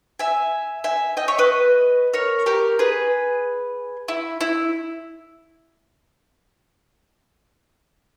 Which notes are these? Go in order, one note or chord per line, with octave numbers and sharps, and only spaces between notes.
E5 G#5
E5 G#5
D#5 G5
C#5 E5
B4 D#5
A#4 C#5
G4 A#4
G#4 B4
E4
E4